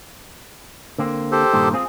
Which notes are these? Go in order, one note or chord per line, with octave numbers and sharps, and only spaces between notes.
D3 A#3 C4
G4 A4 C5
G2 A#2 D#3
C4 F4 G#4